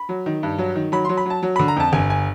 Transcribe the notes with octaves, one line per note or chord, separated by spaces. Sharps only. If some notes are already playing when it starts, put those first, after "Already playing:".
Already playing: B5
F#3
D#3
G2
F#3
D#3
F#3 B5
F#3 C6
B5
F#3 A5
F#3
D3 B5
A#5
F2 A5
G1 G#5
G#5